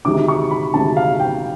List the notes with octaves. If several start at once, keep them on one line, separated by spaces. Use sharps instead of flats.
D2 C3 D#3 G#3 D6
C#6
B5
D2 C3 D#3 G#3 A5
F5
G5